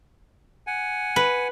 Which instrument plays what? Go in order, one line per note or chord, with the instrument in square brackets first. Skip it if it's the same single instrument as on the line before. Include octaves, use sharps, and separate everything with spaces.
[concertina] F#5 G#5
[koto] B4